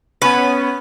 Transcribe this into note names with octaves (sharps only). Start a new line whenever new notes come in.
B3 C#4 B4